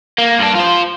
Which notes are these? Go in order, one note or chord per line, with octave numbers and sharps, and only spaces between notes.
A#3
G2 D4
F4 C5